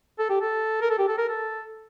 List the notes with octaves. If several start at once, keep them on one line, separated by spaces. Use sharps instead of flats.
A4
G4
A4
A#4
A4
G4
A4
A#4
A4